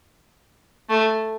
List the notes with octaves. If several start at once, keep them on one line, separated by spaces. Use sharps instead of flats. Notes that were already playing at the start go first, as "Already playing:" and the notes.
A3